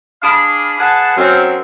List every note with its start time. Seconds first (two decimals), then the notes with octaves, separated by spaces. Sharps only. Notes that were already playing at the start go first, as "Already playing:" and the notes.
0.23 D4 G#4 F5 B5
0.80 G#4 B4 F#5 A5
1.17 F#2 C4